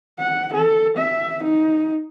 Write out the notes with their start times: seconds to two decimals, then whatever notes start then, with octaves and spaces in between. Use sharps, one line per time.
0.19 F#5
0.54 A4
0.97 E5
1.44 D#4